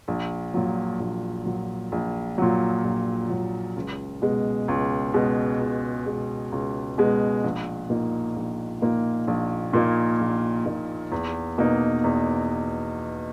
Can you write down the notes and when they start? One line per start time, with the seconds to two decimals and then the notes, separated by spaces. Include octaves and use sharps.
0.08 A#1
0.54 A#2 F#3
1.00 A#1
1.46 A#2 F#3
1.92 A#1
2.38 A#2 F#3
2.84 A#1
3.30 A#2 F#3
3.76 C#2
4.22 B2 G#3
4.68 C#2
5.14 B2 G#3
5.60 C#2
6.06 B2 G#3
6.52 C#2
6.98 B2 G#3
7.44 A#1
7.90 A#2 A#3 D#4
8.36 A#1
8.82 A#2 A#3 D#4
9.28 A#1
9.73 A#2 A#3 D#4
10.20 A#1
10.66 A#2 A#3 D#4
11.12 E2
11.58 B2 A#3 D#4
12.04 E2